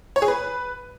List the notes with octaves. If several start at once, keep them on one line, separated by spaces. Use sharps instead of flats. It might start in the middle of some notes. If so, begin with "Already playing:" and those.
C#5
G#4
B4